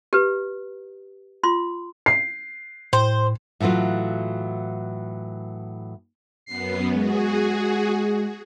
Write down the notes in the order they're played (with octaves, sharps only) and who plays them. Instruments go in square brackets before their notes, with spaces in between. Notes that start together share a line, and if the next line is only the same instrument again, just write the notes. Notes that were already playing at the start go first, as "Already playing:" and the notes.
[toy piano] G4 B4
F4 C6
[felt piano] C7
[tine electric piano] A2 [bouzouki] C5
[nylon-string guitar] A2 E3 F#3 A3 F4
[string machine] F#2 B3 [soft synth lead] C7
[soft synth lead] G#3 [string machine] F#4 G#4